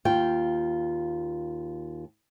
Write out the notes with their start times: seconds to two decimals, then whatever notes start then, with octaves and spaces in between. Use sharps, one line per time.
0.05 D#2 F4 G5